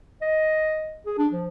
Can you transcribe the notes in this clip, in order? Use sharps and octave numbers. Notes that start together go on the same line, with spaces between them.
D#5
G#4
D4
F3